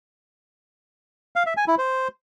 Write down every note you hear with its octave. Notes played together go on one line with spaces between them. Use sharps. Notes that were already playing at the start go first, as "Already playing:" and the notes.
F5
E5
G#5
E4
C5